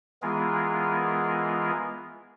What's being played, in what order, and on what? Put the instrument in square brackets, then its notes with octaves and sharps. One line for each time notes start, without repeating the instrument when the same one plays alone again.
[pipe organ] E3 G#3 B3 F4 G#4 A#4